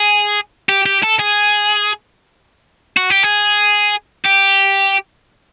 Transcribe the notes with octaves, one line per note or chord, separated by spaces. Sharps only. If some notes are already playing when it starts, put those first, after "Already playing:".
Already playing: G#4
G4
G4
A4
G#4
F#4
G4
G#4
G4